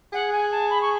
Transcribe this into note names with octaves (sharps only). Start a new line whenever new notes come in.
G#4 F#5
G#5
A5
B5
C#6